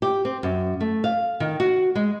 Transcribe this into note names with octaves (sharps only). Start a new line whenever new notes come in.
G4
C4
F#2
A3
F5
D#3
F#4
G#3